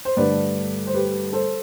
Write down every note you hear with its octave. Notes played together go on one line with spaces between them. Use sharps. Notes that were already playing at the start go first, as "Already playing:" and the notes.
C5
G2 D3 A3 B4 D5
C5
G4 B4
A4 C5